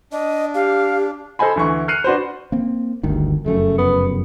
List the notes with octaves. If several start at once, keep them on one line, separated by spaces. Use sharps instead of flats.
D4 D#5
G4 F5
A4 C5 D#5 G#5 B5
D2 E3 C#6
F6 F#6 C7 C#7 D#7 F7
D4 F#4 B4 C5
A#3 C4
G1 D2 D#3
F1 F#2 C#3 A3
B3